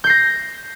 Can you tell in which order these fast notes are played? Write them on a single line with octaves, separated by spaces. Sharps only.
G6 C7 A#6